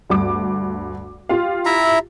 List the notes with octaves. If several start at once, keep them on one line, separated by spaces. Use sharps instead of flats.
D2 G2 D6
F4 G4 F5
E4 E5 A#5